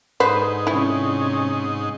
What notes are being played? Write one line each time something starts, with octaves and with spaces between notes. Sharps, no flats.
G#2 D3 D#4 B4 C5
C3 C#4 E4